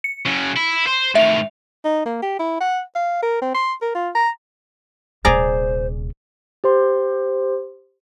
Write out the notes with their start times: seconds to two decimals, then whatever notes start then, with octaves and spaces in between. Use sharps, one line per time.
0.04 C#7
0.26 C#3 F#3
0.57 E4
0.87 C5
1.15 A2 D#3 E5 F7
1.85 D#4
2.06 A#3
2.22 G4
2.39 E4
2.61 F#5
2.95 F5
3.22 A#4
3.42 C4
3.55 C6
3.82 A#4
3.95 F4
4.15 A#5
5.25 D#1 C3 G#4 C5 D5 A#5
6.64 G4 C5 C6